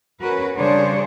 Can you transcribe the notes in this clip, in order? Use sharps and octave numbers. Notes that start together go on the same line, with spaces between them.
C#4 F#4 A#4 B4
C#3 G3 D4 G#4 C5 C#5